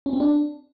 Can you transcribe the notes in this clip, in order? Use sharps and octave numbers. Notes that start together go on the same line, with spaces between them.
C#4
C4
D4